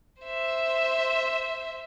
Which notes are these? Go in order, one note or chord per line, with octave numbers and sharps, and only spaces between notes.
C5 E5